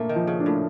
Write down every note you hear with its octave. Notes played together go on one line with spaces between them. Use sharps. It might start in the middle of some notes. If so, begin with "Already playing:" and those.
Already playing: A#2 A3 A#3
D#3
F3
C#3
D4
A2